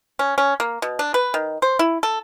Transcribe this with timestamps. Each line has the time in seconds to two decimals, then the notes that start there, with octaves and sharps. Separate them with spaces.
0.19 C#4
0.38 C#4
0.60 A#3
0.82 B2
0.99 D4
1.14 B4
1.34 D#3
1.62 C5
1.79 E4
2.03 A4